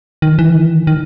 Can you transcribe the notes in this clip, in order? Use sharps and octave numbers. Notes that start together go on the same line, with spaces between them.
D#3
E3
D#3
E3
D#3
D#3